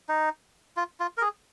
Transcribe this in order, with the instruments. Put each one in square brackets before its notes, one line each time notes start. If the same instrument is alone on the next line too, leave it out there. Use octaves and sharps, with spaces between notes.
[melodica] D#4
F4
F4
A#4
G#4